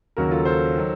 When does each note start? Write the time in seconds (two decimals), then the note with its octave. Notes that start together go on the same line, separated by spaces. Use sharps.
0.17 D#2 C#3 F#3 F#4 A#4
0.31 F4 A4
0.45 A4 C5
0.77 D#3 F#3